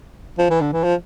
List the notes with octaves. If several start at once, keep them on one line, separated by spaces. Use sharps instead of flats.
F3
E3
D3
E3
F3